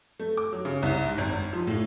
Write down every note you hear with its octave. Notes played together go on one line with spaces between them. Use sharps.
A3
D6
F#3
C#3
C2
G#2
G#1
G#1
F3
A2